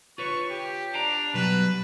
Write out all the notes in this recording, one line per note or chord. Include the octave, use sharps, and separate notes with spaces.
F4 B4 C#5 C#6
G4
D4 F5 G5 A#5
B2 F#3 G3 B4